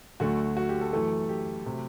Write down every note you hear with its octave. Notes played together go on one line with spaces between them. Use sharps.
D2 D3 F#3 A3 F#4
F#4
G4
A4
F#2 E3 A3 A4
G4
C3 F#3 A3